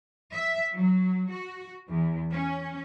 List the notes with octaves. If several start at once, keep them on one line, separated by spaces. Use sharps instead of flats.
E5
F#3
F#4
E2
C#4